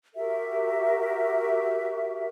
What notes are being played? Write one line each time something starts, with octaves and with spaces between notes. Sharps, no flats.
F#4 G4 A#4 E5